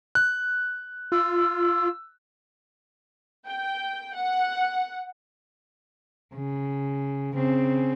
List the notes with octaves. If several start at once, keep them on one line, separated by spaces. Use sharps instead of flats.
F#6
F4 E6
G5
F#5
C#3
C#3 C4